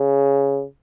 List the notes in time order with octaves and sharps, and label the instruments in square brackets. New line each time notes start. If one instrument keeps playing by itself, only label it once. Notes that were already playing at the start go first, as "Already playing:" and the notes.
Already playing: [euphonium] C#3